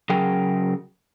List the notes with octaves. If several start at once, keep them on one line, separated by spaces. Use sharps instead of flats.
C#3 F#3 G#4 A#4 G5